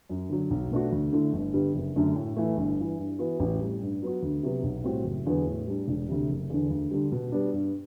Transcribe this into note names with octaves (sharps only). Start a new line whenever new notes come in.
F#2
D3 F#3
B1
B2 A3 D4 F#4
D2
D3 A3 E4
G1
G2 D3 G3 B3
F#1
F#2 D3 A3
A2
E3 A3
G1
G2 E3
G2
E3 B3 F#4
A1
A2 G3
G2
F#3 B3 F#4
D2
C3 F#3 B3
B1
A2 G3 C4 F#4
F#1
E2 D3 F#3 B3
A2
G3 D4
E1
D2 C3
F#1
E2 D3
D2
D3 G3
B2
G3 B3 D4
G2